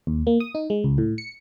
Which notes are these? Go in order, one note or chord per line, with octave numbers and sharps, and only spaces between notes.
D#2
A#3
D#6
D#4
G#3
C#2
A2
C#7